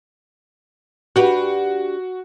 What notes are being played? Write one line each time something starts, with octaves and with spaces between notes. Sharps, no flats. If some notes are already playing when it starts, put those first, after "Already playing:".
D4 F#4 G4 B4